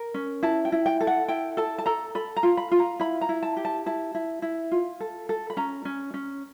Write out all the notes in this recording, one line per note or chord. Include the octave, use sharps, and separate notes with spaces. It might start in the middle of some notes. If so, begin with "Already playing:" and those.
Already playing: A#4
C#4
E4 A5
G5
E4
G5
A4
F#5
E4 G5
A4 A5
A5
A4 A#5
A4 B5
A#5
F4
B5
F4
A#5
E4 B5
A#5
E4
A5
G4
A5
E4 A5
E4
E4
F4
A4
A4
B5
C#4 A#5
C#4
C#4